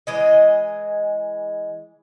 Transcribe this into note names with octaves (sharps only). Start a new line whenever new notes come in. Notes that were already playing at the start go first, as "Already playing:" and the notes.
E3 G#3 D#5